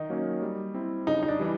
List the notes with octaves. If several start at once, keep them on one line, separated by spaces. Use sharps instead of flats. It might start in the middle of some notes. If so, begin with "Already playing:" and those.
Already playing: D#3 D#4
F#3 A#3 C#4
G3
C4 E4 G4
C#3 D#4
D#4
D4
E3 G3